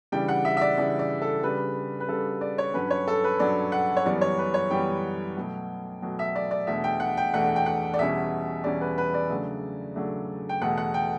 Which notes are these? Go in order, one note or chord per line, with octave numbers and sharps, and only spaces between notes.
C#3 E3 G3 D4 G5
F#5
E5
E5
D5
C#3 E3 G3 D4 D5
D5
A4
C#3 G3 D4 B4
B4
C#3 G3 D4 A4
D5
C#5
G2 F#3 C#4 B4
C#5
A4
B4
G2 F#3 C#4 D5
F#5
C#5
F#2 E3 G3 B3 D5
C#5
B4
C#5
F#2 E3 G3 B3 G5
B2 F#3 A3
B2 F#3 A3
E5
D5
D5
E2 B2 A3 D4 E5
G5
F#5
G5
E2 B2 A3 D4 F#5
G5
F#5
D5
E2 B2 G3 C#4 E5
E2 B2 G3 C#4 D5
B4
B4
D5
C#3 F#3 A3 D4
C#3 F#3 A3 D4
G5
E2 B2 A3 F#5
F#5
G5